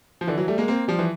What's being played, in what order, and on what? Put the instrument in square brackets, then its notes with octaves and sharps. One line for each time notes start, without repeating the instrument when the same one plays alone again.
[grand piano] F3
D3 E3
E3 F#3
G3 A3
G#3 A#3
A#3 C4
F3 G3
E3